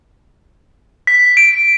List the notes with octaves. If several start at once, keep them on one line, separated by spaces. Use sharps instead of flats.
B6
D7